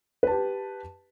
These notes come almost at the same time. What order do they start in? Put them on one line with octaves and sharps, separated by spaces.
B4 A5 G4